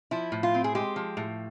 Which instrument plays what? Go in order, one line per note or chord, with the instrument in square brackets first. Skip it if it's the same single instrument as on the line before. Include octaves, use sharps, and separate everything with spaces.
[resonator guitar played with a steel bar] F3 E4
A2
F4
C4
G#4
G#3 G4
F3
A2